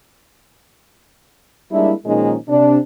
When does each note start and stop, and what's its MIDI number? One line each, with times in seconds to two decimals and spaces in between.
1.72 1.93 55
1.72 1.93 56
1.72 1.93 58
1.72 1.93 62
1.72 1.93 64
2.06 2.35 46
2.06 2.35 51
2.06 2.35 53
2.06 2.35 56
2.06 2.35 61
2.06 2.35 63
2.49 2.78 48
2.49 2.78 62